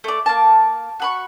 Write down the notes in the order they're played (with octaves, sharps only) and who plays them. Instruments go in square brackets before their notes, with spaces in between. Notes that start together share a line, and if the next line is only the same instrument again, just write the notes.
[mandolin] A3 D5
A#3 A5
F#4 B5 C#6